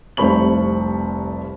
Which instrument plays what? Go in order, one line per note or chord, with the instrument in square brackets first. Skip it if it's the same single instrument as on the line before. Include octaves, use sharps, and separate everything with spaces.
[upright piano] F1 C2 C5 B5 C#6 F#7